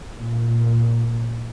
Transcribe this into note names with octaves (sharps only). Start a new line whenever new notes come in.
A#2